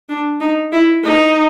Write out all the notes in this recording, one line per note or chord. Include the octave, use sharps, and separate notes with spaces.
D4
D#4
E4
D#4